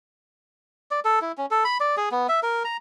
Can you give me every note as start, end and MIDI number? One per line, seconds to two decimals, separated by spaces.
0.91 1.00 74
1.05 1.19 69
1.22 1.32 64
1.38 1.46 61
1.51 1.64 69
1.65 1.78 83
1.80 1.96 74
1.97 2.09 68
2.11 2.27 59
2.29 2.40 76
2.43 2.63 70
2.65 2.77 82